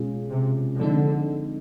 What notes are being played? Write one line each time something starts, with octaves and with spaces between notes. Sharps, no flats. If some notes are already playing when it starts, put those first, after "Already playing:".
Already playing: B2 G#3 C#4 F4 G#4
C3
D3 F3 G#3 C4 D#4